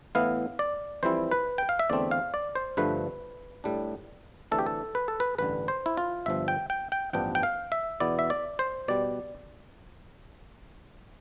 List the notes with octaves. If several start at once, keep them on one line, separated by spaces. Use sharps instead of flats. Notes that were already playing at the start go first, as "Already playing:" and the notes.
A2 E3 B3 E4 F5
D5
F2 E3 G3 C4 E4 C5
B4
G5
F5
E5
E2 D3 A3 C4 D5
F5
D5
C5
G2 D3 F3 A3 B4
A2 G3 D4
D2 C3 E3 A3 D4 A4
G4
A4
B4
A4
B4
A1 G2 D3 B4
C5
E4
F4
G1 G2 F3 E5
G5
G5
G5
A1 G2 F3 B3 D4 G5
G5
F5
E5
E2 B2 B3 E4 D5
E5
D5
C5
B2 G3 D5